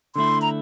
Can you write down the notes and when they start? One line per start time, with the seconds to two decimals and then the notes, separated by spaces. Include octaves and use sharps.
0.16 D3 A3 E4 C6
0.42 A#5